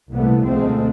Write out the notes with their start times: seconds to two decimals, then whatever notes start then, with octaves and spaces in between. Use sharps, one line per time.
0.13 C2 A#2 E3 G3 A3 B3
0.46 D2 B2 F3 G#3 A3 C4